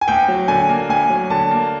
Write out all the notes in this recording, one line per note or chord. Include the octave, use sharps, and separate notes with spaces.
G#5
D2 G5
F#3
D3 G#5
A#3
D2 G#5
F#3
D3 A5
A#3